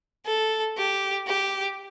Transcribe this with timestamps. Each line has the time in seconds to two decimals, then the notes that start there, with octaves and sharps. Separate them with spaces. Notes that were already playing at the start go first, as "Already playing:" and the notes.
0.26 A4
0.77 G4
1.27 G4